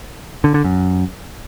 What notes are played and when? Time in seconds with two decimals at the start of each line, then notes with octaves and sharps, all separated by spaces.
0.44 D3
0.54 D3
0.64 F#2